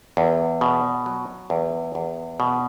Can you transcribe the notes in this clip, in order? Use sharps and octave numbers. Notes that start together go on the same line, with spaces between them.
E2
B2
F#3
E2
E2
B2